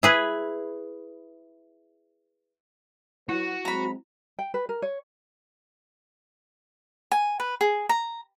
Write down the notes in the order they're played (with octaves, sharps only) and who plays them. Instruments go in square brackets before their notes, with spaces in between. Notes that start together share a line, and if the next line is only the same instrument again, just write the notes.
[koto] E4 G#4 B4
[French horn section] F#3 B4 [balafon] E4 [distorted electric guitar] F#4
[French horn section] F#3 G#3 C4 [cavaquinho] A#5 B5
[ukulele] G5
B4
A#4
C#5
[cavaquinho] G#5
B4
G#4
A#5